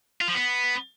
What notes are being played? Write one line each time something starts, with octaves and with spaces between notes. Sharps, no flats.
F4
F3
B3